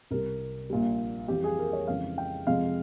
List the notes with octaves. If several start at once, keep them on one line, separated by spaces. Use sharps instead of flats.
C2 C3 G3 A#4
A#1 A#2 G3
F2 E3 G3 G4
G#4
A#4
C#5
F2 C#3 E3 G#3 F5
G5
F2 C3 F3 G#3 F5